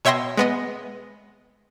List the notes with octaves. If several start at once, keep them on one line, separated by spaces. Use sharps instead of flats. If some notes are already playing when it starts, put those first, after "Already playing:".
B2 C#5 E5 G5 C6 A#6
G#3 B3 D#5